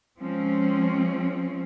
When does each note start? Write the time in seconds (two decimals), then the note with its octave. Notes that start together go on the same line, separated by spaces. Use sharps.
0.20 F3 G#3 C4 C#4